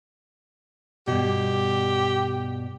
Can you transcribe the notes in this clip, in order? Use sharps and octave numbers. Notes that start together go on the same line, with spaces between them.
G2 B2 G4